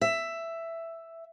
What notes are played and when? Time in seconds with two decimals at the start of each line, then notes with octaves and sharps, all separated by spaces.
0.01 E5